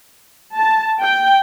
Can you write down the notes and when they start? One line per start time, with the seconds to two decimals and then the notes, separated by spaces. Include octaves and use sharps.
0.55 A5
1.01 G5